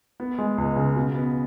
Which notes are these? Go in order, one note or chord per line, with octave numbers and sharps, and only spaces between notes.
B3
G#3
C#2
C#3
B2
B3